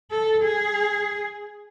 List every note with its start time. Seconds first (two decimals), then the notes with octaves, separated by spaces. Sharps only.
0.11 A4
0.44 G#4